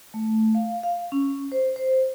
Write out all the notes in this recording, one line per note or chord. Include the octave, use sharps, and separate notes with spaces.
A3
F5
F5
C#4
C5
C5